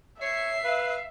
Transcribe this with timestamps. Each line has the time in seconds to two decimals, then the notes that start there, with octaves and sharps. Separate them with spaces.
0.21 C#5 E5 C7
0.64 B4 F5